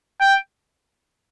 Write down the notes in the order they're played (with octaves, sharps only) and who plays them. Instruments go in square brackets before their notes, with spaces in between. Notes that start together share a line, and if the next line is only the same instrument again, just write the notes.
[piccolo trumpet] G5